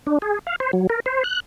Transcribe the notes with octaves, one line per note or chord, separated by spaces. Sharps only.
D4
G#4
F5
C5
F#3
A#4
C5
F#6